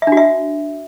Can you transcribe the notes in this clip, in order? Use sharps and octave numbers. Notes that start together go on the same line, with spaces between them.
E5
D4
F#4
E5